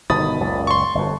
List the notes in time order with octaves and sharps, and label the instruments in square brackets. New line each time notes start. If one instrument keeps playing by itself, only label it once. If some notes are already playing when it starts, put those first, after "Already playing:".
[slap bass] G1 B2 D#3 [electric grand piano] B5 D#6 A6
[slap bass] F#1 C#2 A#2
[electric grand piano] C6 C#6
[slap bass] G1 F2